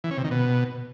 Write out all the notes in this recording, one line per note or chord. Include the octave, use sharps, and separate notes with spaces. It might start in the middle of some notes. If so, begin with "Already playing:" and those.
E3
C#4
C3
D#3
B2